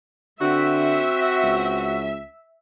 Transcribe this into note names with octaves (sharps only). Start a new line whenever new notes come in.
D3 C4 F#4 E5
C#2